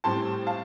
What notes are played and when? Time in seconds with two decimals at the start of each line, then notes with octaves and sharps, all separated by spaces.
0.04 A2 G3 C4 A5 C6
0.47 F5 A5